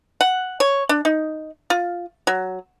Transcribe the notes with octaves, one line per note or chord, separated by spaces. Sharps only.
F#5
C#5
D4
D#4
F4
F#3